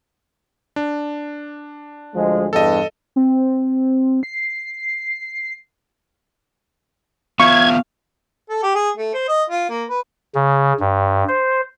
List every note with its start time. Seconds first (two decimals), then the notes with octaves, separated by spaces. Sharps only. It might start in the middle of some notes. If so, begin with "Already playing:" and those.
0.76 D4
2.15 D2 F3 G#3
2.53 E2 G2 A4 D#5
3.16 C4
4.23 C7
7.40 B3 F4 E5 F5 C#6 G#6
8.49 A4
8.63 G4
8.75 G#4
8.97 A3
9.14 C5
9.28 D#5
9.50 F4
9.69 A#3
9.89 B4
10.35 C#3
10.80 G2
11.28 C5